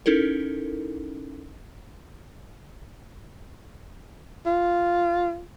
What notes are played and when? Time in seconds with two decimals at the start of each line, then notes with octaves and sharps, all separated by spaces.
0.06 C#4 D#4 E4 A4 A#4
4.46 F4